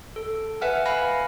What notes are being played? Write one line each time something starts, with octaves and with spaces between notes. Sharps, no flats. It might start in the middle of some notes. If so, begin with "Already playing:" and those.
A4
B4 E5 F#5 G#5 F6
F5 F#5 G#5 B5 F6 A#6